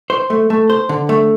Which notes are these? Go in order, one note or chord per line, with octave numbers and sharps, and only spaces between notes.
C5
A3
A3
C5
D3
A3